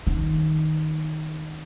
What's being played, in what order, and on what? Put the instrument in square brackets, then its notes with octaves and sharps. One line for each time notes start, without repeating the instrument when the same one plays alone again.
[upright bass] D#3